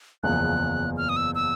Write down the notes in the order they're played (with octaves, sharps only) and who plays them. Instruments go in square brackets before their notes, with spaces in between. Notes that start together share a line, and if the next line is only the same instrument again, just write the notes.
[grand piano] F#1 E2 C#3 F3 [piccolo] F#6
[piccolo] F6
D#6
E6
E6